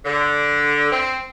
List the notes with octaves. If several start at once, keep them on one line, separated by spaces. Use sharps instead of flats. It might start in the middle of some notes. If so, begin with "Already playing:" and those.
D3
C4